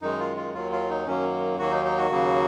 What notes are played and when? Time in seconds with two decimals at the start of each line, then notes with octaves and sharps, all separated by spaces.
0.02 F#2 D#3 G#3 D#4
0.19 F4
0.37 F4
0.54 D#2 D#3 F#3 F4
0.72 F4
0.89 D#4
1.06 F#2 D#3 F#3 A#3 C#4
1.59 D#2 D#3 F#3 A#3 F#4
1.71 D#4
1.85 D#4
1.98 F#4
2.11 D#2 C#3 F#3 A#3